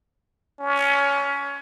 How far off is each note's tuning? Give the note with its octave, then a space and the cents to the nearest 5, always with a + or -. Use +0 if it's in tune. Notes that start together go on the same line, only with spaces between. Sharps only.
C#4 +20